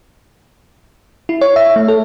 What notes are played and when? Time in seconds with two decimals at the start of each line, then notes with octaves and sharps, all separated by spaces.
1.29 E4
1.41 C#5
1.56 E5
1.76 A3
1.88 A4